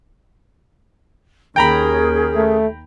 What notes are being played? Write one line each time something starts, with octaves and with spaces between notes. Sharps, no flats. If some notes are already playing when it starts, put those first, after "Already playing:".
D#2 C#4 G#4 A#4 G5 A#5 B5
A3